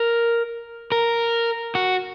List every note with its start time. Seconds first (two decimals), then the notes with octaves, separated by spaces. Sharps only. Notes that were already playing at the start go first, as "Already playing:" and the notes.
Already playing: A#4
0.92 A#4
1.75 F#4